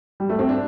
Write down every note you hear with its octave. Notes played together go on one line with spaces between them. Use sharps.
G3
A3
C4
D4